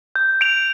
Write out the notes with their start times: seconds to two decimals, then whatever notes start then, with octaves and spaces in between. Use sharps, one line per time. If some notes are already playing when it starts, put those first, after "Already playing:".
0.16 G6
0.41 D7 F7